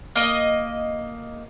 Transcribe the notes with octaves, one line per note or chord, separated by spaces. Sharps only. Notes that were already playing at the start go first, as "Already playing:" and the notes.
A#3 D#5